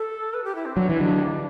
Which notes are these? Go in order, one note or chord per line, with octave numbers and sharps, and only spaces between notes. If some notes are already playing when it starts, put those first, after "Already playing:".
Already playing: A4
B4
G4
E4
C4
F#3 D4
E3
D3 F#3